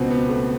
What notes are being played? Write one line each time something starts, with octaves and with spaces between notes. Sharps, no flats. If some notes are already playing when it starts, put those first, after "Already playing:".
Already playing: C#2 B2 B3 C4
B3
A3